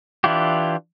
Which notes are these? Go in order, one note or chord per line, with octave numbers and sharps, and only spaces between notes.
E3 D4 E4 F4 G4